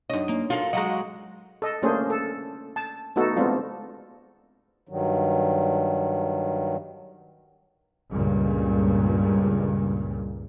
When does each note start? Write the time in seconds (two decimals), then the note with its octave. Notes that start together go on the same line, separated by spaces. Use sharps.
0.10 F#2 D4 D#4 C#5 D#5
0.29 A#3
0.50 F4 F#4 A4 A#4
0.73 F#3 G#3 D#5 F5 F#5 A#5
1.62 A4 D#5
1.82 A3 A#3 C#4 D4 G#4 C5
2.10 A4
2.76 A5
3.16 A3 B3 D#4 F#4 A4
3.36 G#3 A3 B3 C4 D4 F4
4.89 G2 D#3 F#3
8.12 C#2 G2 A#2